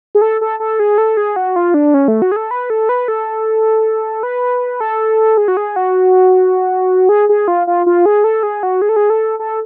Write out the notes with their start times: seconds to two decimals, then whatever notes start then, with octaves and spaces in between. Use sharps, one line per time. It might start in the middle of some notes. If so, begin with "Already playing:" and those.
0.15 G#4
0.22 A4
0.41 A4
0.60 A4
0.80 G#4
0.98 A4
1.17 G#4
1.36 F#4
1.56 F4
1.74 D4
1.94 C#4
2.08 A3
2.22 F#4
2.32 G#4
2.36 A4
2.51 B4
2.70 A4
2.89 B4
3.08 A4
4.23 B4
4.81 A4
5.38 G#4
5.48 F#4
5.57 G#4
5.76 F#4
7.09 G#4
7.29 G#4
7.48 F4
7.67 F4
7.86 F4
8.06 G#4
8.24 A4
8.43 G#4
8.63 F#4
8.82 G#4
8.89 A4
8.96 G#4
9.10 A4
9.39 A4